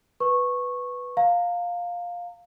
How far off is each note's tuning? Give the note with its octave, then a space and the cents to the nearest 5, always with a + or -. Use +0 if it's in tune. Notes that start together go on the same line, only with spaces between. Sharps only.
B4 +0 C#6 -15
F5 +10 A#5 -30